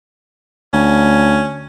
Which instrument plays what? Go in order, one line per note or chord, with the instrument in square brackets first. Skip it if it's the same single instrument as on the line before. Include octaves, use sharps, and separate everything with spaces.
[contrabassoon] D2 [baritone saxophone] C#4